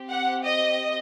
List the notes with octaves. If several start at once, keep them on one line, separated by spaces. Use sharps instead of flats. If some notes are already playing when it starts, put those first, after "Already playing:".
Already playing: C4 G4
F#5
D#5